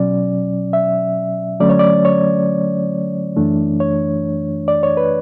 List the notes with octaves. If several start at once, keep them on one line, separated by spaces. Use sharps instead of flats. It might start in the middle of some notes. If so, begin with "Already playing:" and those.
Already playing: B2 F#3 C#4 D5
E5
D3 F#3 A3 C#4 D5
C#5
D5
C#5
F#2 E3 A3 D4
C#5
D5
C#5
B4